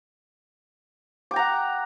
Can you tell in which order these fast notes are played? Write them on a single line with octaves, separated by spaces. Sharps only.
D6 G5 A#5 F#5